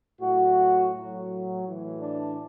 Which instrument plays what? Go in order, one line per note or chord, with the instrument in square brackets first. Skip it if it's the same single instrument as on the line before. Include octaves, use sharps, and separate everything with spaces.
[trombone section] A2 F#3 F#4
A2 F#3
A2 E3
D4